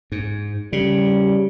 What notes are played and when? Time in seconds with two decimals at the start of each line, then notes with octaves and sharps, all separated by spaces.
0.12 G#2
0.73 C#3 G3